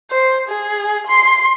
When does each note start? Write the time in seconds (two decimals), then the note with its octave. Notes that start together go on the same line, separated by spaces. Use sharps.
0.11 C5
0.48 G#4
1.07 C6